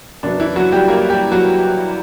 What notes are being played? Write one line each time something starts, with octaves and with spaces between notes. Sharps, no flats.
F#2 C#3 F#3 B3 D4
E3 E4
F#3 F#4
G3 G4
A#3 A#4
G3 G4
F#3 F#4